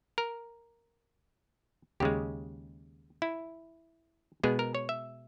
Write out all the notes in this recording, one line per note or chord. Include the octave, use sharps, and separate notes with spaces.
A#4
D#2 C#3 G#3 G4
E4
B2 G#3 B3 G#4
A#4
C#5
E5